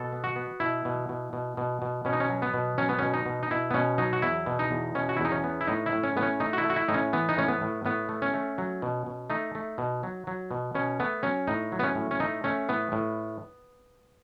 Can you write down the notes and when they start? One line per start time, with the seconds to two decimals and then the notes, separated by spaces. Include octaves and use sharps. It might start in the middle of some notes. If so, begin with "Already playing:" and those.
Already playing: B2 A4
0.12 B3
0.24 F#4
0.36 B3
0.60 B2 E4
0.85 B2
1.09 B2
1.33 B2
1.57 B2
1.82 B2
2.05 B2 C#4
2.13 D#4
2.20 C#4
2.29 F#3
2.42 B3
2.54 B2
2.78 F#3 C#4
2.89 B3
2.99 B2 C#4
3.14 D#4
3.26 B2
3.43 D#4
3.51 B2 E4
3.71 B3
3.74 B2 C#4
3.98 F#3 D#4
4.13 F#4
4.22 E2 E4
4.46 B2
4.59 D#4
4.71 E2
4.95 B2 C#4
5.09 F#4
5.17 E4
5.20 E2
5.25 D#4
5.32 C#4
5.44 B3
5.61 E4
5.67 A2 D#4
5.86 E4
5.92 A2
6.03 C#4
6.16 A2 B3
6.23 C#4
6.40 A3 D#4
6.53 F#4
6.58 E4
6.64 A3
6.70 F#4
6.76 E4
6.88 A2 D#4
6.94 C#4
7.13 E3 B3
7.29 D#4
7.37 A2 C#4
7.48 B3
7.61 A2
7.85 A2 B3
8.09 A3
8.22 C#4
8.34 A3
8.58 F#3
8.82 B2
9.06 B2
9.30 A3 D#4
9.55 A3
9.78 B2
10.03 F#3
10.27 F#3
10.51 B2
10.75 B2 C#4
11.00 A3 B3
11.23 F#3 C#4
11.47 A2 D#4
11.72 F#3
11.79 B3
11.83 C#4
11.95 A2
12.11 C#4
12.20 A3 D#4
12.44 A3 C#4
12.69 A2 B3
12.92 A2